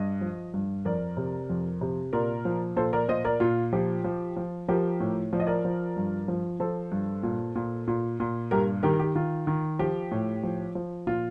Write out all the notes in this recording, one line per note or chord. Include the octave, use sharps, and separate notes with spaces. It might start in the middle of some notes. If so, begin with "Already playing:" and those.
Already playing: G2 D#5
F3
G2
F2 A#4 D5
C3
F2
C3
A#2 A#4 D5
F3
A#2 A4 C5
A#4 D5
A#2 C5 D#5
A#4 D5
A#2 F4
F3 G4
F3
F3
F3 G4 A#4
A2
F3 D5
D#5
A#4 D5
F3
G2
F3
F3 A4 C5
G2
A#2
A#2
A#2
A#2
G2 G4 A#4
D#3 G4 A#4
G4
D#3 F4
D#3
F3 G4
A2
F3
F3
A#2 F4